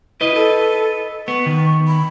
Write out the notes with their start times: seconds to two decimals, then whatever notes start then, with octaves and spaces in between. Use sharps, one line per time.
0.21 E4 B4 D#5
0.35 A4
1.28 B3 C#6
1.46 D#3
1.88 B5